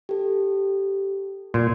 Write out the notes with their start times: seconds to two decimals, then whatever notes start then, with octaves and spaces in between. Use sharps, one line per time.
0.09 G4 A4
1.54 A#2 C6 G#6